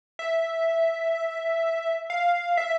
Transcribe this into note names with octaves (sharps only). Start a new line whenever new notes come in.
E5
F5
E5